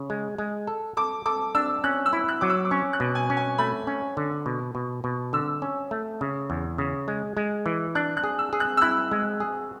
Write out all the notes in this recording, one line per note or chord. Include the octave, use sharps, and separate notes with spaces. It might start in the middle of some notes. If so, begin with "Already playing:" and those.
Already playing: C#3
G#3
G#3
A4
A4 D6
A4 D6
D4 E6
C#4 F#6
E6
E4
F#6
F#3 D6
E6
D6
C#4 C#6
F#6
B2
G#5
C#4
G#5
A3 B5
C#4
D3
B2
B2
B2
D3 E6
C#4
A3
C#3
E2
C#3
G#3
G#3
E3
D4 F#6
F#6
G#4
E6
G#4
F#6
E6
E4 F#6
G#3
G#4